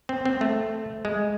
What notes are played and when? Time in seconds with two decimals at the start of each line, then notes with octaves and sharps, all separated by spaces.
0.09 C4
0.25 C4
0.41 A3
1.05 G#3